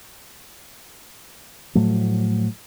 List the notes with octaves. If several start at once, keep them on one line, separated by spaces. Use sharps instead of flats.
A2 F3 F#3 A3